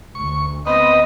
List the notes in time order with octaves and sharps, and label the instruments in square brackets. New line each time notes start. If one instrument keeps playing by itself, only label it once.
[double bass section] D2 [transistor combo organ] C#6
[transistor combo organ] B3 C4 [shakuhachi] D#5 [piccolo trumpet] D#6